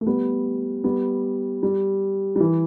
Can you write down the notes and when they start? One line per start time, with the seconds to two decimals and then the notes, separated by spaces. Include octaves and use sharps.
0.01 A3
0.07 G3 B3
0.84 G3 B3
1.63 G3
2.36 G3
2.40 E3